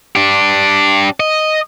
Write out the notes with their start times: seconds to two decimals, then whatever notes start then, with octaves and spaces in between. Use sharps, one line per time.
0.16 D4 G4
1.20 D#5